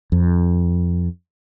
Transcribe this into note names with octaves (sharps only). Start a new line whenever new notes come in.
F2